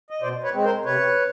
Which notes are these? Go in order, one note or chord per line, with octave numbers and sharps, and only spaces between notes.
D#5
B2 C5 D5
B4 C#5
G#3 C4
A#4 C5
C3 B4 C#5